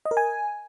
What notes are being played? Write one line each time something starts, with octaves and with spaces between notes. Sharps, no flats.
D#5
A#4
G#5